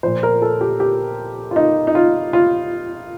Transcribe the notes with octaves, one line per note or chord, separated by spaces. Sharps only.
A#2 F3 C5
A#4
A4
G4
G4
F4
D#4
D#4
F4
F4